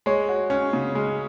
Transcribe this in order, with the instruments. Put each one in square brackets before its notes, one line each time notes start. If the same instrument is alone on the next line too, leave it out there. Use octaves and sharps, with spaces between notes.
[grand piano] G#3 [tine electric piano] C#5
[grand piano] F#4
C#4
C#3
G#3